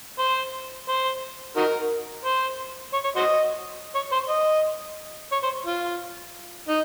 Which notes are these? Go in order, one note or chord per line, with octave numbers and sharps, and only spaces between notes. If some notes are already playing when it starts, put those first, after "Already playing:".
C5
C5
D#4 F#4 A#4
C5
C#5
C#5
F#4 C5 D#5
C#5
C5
D#5
C#5
C5
F4
D#4